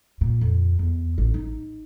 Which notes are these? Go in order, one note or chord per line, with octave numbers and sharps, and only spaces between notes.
A#2
F2
E2
A1
D#4